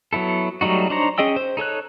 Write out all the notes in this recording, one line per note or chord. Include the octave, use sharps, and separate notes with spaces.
F#3 B3 E4 A4
F#3 G3 A3 D#4 F#4
D4 D#4 C5 C#5 A#5
C#4 G#4 D#5 G5 E6
C5
D#4 A4 C#5 F#6